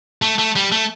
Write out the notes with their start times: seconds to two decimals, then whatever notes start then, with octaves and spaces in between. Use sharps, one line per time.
0.22 A3
0.38 A3
0.56 G3
0.72 A3